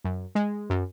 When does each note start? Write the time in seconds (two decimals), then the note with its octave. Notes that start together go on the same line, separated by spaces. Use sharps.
0.04 F#2
0.35 G#3
0.70 F#2